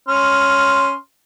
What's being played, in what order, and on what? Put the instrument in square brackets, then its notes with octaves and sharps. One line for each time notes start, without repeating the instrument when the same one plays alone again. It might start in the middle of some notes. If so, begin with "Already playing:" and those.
[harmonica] C#4 C6 F6